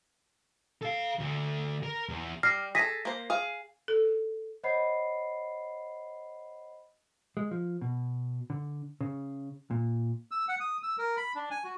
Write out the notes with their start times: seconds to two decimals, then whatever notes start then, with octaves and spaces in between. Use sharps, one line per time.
0.82 A4 F5
1.19 D2
1.83 A#4
2.09 E2
2.43 G3 F6 A#6 C7
2.75 G#4 A4 A#6 B6 D#7
3.05 A#3 C5
3.30 G#4 F5
3.88 A4
4.63 C5 C#5 D#5 F#5 B5 C7
7.37 G#3
7.51 F3
7.81 B2
8.50 D3
9.01 C#3
9.71 A#2
10.31 E6
10.48 F#5
10.60 D#6
10.83 E6
10.98 A#4
11.17 B5
11.35 D4
11.51 G#5
11.64 F#4